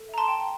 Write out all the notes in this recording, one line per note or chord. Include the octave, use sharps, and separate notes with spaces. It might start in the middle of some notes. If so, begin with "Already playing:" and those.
Already playing: A4
E5 A#5
A5 C6
G5